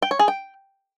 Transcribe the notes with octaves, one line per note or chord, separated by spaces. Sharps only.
G5
C#5
G#4
G5